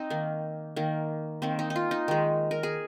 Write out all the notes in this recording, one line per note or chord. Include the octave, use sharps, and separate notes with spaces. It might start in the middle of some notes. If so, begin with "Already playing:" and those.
Already playing: C4 D#4
D#3 A#3
D#3 A#3
D#3 A#3 C4
D#4
D#4
F4
D#4
D#3 G#3
A#4
G#4